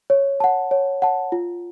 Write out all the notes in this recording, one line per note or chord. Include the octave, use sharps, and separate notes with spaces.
C#5
F#5 A5
C#5
F#5 A5
F4